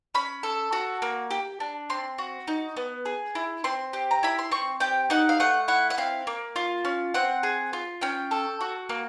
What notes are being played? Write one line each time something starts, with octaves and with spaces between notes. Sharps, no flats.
C#4 B5
A4
F#4
A#3
G4
D4
C4 C6
F#4
D#4
B3
G#4
E4
C4 C6
G4
A#5
E4 B5
C6
C4 C#6
G4 G5
D#4 F#5
F5
A3 F#5
E4 F#5
F#5
C4 F5
A#3
F4
C#4
C4 F#5
G#4
F4
C#4 G5
A4
F#4
A#3